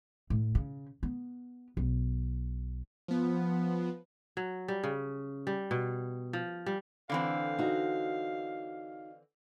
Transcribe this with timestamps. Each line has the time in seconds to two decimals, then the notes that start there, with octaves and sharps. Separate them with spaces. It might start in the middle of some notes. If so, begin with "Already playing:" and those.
0.30 A2
0.55 C#3
1.03 B3
1.77 B1
3.08 F3 B3
4.37 F#3
4.68 G3
4.84 C#3
5.47 G3
5.71 B2
6.33 F3
6.66 G3
7.10 D3 E3 C4 F5
7.58 D#4 F#4